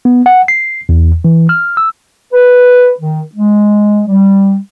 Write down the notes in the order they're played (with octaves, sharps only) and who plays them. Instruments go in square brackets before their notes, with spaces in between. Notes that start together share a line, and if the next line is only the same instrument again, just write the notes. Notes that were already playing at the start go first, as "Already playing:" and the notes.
[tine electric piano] B3
F#5
C7
E2
E3
F6
E6
[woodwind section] B4
D#3
G#3
G3